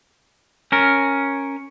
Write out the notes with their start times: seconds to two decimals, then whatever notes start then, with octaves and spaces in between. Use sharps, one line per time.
0.72 C#4 A#4